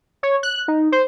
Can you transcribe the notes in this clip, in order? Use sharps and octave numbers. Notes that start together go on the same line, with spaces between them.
C#5
F#6
D#4
C5